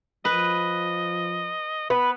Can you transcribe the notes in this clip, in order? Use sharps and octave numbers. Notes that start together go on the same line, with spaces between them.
F3 B4 D#5
B3 B4